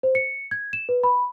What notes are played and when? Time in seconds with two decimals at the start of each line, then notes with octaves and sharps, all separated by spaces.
0.03 C5
0.15 C#7
0.51 G#6
0.73 E7
0.89 B4
1.04 B5